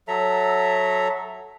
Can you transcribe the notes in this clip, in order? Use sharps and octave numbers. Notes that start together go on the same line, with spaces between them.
F#3 A4 E5 A#5